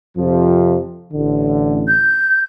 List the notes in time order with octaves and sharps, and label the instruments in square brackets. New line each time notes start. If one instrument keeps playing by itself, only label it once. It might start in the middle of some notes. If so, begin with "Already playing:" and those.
[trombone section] F2 C3 F3
A1 D3
[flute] G6